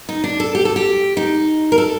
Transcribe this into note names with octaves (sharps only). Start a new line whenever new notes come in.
D#4
D4
A4
G4
A4
G4
D#4
A#4
A4